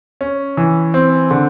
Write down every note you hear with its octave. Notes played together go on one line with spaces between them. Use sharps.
C#4
E3
C4
D3